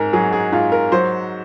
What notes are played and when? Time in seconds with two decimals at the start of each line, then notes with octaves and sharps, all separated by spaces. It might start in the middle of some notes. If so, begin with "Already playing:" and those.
Already playing: G#2 G#4 A#4
0.13 F#3 G#4
0.33 G#4
0.52 G#2 F4
0.72 A#4
0.92 F#3 C5